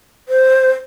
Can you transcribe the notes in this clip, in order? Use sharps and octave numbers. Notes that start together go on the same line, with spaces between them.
C5